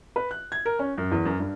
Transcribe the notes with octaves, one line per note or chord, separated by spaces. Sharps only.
B4
F#6
G#6
A#4
C#4
F#2
E2
F#2
G2